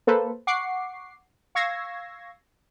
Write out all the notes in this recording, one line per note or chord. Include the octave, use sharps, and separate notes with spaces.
A#3 A4 B4 C5
F#5 C#6 D6 C7
F5 C#6 E6 G#6 A#6 C7